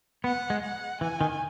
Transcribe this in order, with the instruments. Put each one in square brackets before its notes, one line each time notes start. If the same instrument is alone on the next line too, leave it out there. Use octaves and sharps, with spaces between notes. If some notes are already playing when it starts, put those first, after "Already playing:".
[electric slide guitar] B3 [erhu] F#5
[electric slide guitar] G#3
[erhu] F#5
[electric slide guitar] E3 [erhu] G#5
[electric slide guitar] D#3